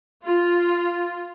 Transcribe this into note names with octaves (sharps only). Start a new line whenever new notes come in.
F4